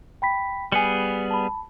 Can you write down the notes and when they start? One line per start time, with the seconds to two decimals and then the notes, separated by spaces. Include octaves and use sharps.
0.22 G5 B5 B6
0.72 G3 B3 G#4 G#5 C#7
1.31 A5 B5